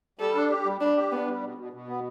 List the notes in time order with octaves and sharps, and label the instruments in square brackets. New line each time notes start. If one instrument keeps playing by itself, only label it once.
[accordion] G3 [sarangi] A4
[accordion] D4
G4
G3
[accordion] G3 [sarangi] D4
[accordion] G4
[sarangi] B3 [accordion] D4
[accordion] G3
B2
B2
B2
B3